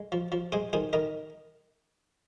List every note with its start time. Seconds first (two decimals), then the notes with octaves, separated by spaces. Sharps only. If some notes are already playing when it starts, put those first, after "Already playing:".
Already playing: G#3
0.12 F3
0.32 F3
0.52 G#3 G#4 C5
0.73 D#3 G#4 C5
0.93 D#3 A#4 D#5